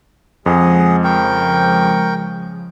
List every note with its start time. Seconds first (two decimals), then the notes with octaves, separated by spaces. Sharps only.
0.46 F2 C#3 F3 G#3 G#4 D#5 F#5
1.04 A#4 G5 C#6